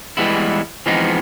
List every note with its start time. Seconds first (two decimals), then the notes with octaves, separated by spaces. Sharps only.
0.17 E3 G3 G#3 B3 E4
0.86 E3 F3 G#3 B3 C4 D#4